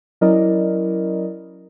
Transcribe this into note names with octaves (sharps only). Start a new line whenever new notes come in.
F#3 C#4 E4 A#4 D5 D#5